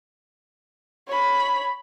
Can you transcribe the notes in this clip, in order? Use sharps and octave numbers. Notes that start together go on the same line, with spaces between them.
C#5 B5